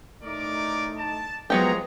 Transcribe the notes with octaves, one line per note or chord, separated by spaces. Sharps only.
A2 A3 D#4 A#4 D5 D6
A5
C2 F3 F#3 G#3 B3 G4 C#5 A#5